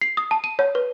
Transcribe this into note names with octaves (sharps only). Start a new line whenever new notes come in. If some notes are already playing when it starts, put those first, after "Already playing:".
C7
D#6
A5
D#7
C#5
B4